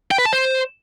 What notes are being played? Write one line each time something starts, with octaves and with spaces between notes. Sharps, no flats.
G5
B4
A5
C5